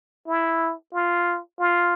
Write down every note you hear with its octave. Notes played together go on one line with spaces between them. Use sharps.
E4
F4
F4